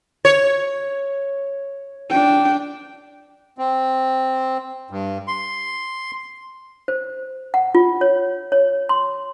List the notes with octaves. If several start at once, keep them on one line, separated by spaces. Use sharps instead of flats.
C#5
D4 G5
C4
G2
C6
C5
F#5
F4
C#5
C#5
C6